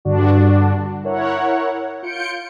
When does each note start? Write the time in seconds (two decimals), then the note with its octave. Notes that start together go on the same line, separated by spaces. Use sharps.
0.05 G2 D3 D4 F#4
1.04 E4 A#4 C#5 F#5
2.03 F4 G6 C#7 D7